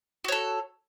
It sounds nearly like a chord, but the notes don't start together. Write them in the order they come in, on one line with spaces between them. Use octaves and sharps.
F#4 C#5 A4